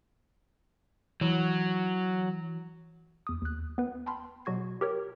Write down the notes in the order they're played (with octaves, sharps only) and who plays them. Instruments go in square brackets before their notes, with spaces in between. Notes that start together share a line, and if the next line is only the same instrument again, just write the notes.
[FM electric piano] E3 [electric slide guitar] F#3
[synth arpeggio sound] E2 D#6
D#2 F#6
B3 B4
G5 A5 B5 C6 F6
B2 F#3 F#4 G#6 C7
G4 A#4 C#5